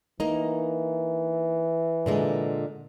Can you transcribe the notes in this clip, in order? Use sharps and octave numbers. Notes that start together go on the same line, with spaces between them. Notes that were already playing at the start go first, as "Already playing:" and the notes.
E3 A#3 D#4
A#2 D3 G#3